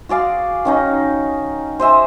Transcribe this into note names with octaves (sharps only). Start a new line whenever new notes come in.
F#4 G#4 D5 F5
D#3 C#4 D#4
C5 D#5 E5 G#5